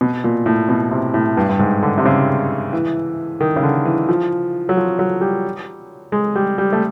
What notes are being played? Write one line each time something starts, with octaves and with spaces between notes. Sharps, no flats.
B2
A#2
A2
B2
C3
A2
G2
G2
G#2
D3
C3
C#3
E3
D#3
C#3
D3
E3
F3
F#3
F3
F#3
G3
G#3
G3
G3
A3